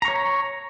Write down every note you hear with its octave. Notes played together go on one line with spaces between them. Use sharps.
C#5 A#5 C#6